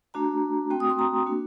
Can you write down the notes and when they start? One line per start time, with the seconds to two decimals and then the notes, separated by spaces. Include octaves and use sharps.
0.14 A3 D4 F#4 A#5
0.70 A3 C4 F#4 G5
0.80 D#6
0.90 C6
0.99 A#5
1.26 A#3 D4 F#4